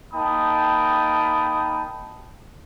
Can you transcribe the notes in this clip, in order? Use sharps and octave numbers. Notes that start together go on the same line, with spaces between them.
A#3 D#4 G5 A5 B5 D#6